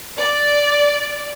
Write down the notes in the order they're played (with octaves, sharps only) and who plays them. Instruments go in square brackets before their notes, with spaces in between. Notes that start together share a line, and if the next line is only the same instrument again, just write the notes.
[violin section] D5